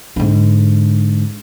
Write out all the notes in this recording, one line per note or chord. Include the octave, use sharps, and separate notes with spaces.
G#2 D3